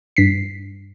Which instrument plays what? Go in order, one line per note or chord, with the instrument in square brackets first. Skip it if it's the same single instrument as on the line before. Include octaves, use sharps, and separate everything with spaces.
[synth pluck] G2 B6 C7